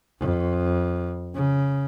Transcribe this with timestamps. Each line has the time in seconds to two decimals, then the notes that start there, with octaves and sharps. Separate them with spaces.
0.20 F2
1.35 C#3